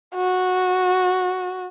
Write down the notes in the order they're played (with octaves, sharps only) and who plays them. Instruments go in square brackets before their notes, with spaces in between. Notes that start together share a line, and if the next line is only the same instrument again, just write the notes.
[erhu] F#4